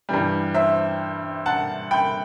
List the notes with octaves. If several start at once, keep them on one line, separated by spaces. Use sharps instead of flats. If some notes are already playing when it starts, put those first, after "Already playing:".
G2 E3 G3
C5 E5
F#5 A5
G5 B5